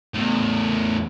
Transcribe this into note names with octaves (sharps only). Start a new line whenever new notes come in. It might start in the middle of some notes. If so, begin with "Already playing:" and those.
E2 A2